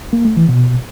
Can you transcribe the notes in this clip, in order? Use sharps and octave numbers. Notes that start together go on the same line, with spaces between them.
A#3
A3
E3
B2